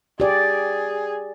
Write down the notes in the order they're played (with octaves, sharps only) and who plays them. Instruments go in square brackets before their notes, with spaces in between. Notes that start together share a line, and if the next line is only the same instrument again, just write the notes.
[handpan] G4 D5 [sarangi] G#4